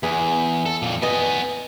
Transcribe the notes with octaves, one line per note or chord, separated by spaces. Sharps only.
E2 B3 G#4
A4
F2 A#2
B3 B4 D#5 G#5